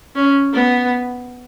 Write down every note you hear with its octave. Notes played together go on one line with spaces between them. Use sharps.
C#4
B3